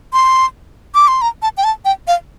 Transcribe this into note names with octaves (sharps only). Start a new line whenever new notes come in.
C6
D6
C6
A#5
A5
G5
A5
G5
F5